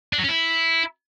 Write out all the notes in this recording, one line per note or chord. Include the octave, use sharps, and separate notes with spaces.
D4
F#3
C#4
E4